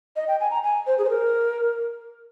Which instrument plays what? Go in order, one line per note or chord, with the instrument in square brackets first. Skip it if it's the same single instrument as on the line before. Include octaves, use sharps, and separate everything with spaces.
[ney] D#5
G5
G#5
A#5
G#5
C5
G#4
C5
A#4